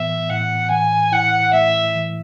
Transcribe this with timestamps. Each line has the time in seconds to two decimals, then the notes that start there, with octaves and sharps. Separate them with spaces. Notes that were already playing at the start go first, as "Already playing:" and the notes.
Already playing: A2 E3 B3 E5
0.30 A2 F#5
0.71 E3 G#5
1.12 E4 F#5
1.53 A3 E5
1.95 E3